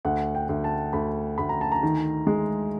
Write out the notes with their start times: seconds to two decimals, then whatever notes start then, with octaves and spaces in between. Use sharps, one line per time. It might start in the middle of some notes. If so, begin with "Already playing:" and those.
0.05 D2 F#5
0.35 G5
0.49 D2
0.64 A5
0.93 D2 B5
1.38 D2 B5
1.49 A#5
1.61 A5
1.72 A#5
1.83 D#3
2.27 G#3